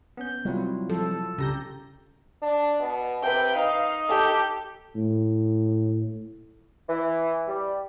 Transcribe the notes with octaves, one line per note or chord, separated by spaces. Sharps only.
B3 C#4 G6
C3 F#3 G3 C4 E4 F4
F3 A4
C2 C#3 G4 A#5 G6
D4
B2
C3 B4 G5
D#4 F5
G4 A4
A2
E3
G3